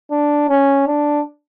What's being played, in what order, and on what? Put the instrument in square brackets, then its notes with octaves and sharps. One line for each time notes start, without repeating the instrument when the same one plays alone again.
[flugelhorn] D4
C#4
D4